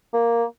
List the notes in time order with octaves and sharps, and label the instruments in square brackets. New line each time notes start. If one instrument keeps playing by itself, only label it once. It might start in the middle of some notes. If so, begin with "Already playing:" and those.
[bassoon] A#3